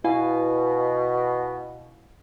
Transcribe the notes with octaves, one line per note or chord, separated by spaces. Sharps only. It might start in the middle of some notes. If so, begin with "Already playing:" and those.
B2 E4 F5 G#5